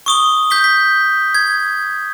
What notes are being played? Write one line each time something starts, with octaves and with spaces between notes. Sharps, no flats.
C#6 D#6 G7
G6 B6 G7
B6
G#6